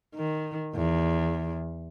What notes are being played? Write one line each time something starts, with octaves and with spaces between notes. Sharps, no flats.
D#3
E2